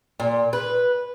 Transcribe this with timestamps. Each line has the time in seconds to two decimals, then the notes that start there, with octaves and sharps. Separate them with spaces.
0.20 A#2
0.53 B4